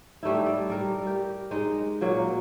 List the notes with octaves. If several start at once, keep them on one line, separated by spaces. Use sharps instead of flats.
G3 A3 D#4 E4
D5
G3 A#4
G4
G#3 D#4
A#2 F#3 A#3